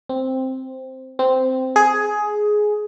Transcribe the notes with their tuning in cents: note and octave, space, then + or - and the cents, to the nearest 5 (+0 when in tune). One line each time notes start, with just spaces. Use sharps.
C4 +0
C4 -10
G#4 +10